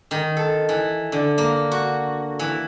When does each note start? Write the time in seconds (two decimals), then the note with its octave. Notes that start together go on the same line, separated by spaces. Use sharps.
0.11 D#3
0.37 A4
0.69 E3
1.12 D3
1.38 A#3
1.71 F#4
2.39 E3